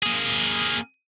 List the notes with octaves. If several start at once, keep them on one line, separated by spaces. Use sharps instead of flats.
A#3 G#4